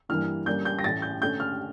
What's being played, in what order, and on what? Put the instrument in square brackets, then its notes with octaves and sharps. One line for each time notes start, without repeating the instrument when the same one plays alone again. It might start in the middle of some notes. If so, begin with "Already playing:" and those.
[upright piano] G2 E3 G3 A#3 F6
D3 G3 A#3 C#4 G6
G6
A#6
A2 E3 A3 C#4 A6
G6
D3 A3 C#4 G6
F6